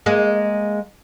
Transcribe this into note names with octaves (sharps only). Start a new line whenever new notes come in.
G#3 A#3